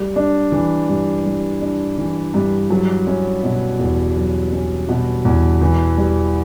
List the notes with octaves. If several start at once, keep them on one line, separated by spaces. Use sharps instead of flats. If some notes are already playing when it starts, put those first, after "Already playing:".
Already playing: G3
D4
E3
G2
G3
D4
E3
G2
F#3
C#4
B2
E2
F#3
C#4
B2
E2
E3
G3